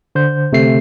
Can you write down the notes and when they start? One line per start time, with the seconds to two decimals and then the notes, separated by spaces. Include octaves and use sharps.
0.15 D3 C5 G6
0.53 C3 A3 C7